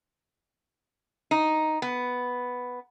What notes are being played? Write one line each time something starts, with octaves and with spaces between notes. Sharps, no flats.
D#4
B3